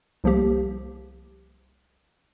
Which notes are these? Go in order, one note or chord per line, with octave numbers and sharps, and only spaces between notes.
C2 F3 A#3 G4